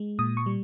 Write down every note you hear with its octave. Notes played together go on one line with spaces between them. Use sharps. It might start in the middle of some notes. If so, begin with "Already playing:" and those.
Already playing: G#3
A#2 D#6
C#6
G3